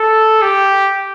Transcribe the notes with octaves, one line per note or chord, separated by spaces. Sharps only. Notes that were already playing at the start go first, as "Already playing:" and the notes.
Already playing: A4
G4